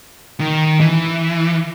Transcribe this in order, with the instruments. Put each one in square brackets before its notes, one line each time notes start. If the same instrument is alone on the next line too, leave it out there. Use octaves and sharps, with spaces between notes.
[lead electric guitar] D#3
E3